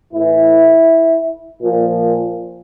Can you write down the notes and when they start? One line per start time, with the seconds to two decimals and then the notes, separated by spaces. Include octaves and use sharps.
0.11 A2 E3 E4
1.58 A#2 F3